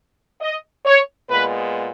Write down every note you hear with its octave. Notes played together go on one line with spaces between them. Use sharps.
D#5
C#5
A#2 G#3 B3 B4